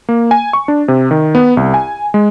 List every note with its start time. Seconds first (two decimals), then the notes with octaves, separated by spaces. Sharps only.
0.09 A#3
0.31 G#5
0.53 C#6
0.68 D4
0.88 C3
1.11 D#3
1.35 B3
1.57 C2
1.74 G#5
2.14 G#3